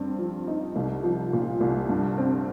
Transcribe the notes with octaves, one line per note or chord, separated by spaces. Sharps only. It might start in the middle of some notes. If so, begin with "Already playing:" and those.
Already playing: G2 C4
F3
D#4
C2
F3
A#2
C2
G2
C4